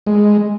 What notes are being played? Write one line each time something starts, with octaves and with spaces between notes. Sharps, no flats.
G#3